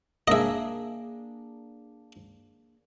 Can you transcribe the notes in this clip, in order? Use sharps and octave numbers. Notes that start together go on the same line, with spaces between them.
A#3 D4 G#4 D#5 E5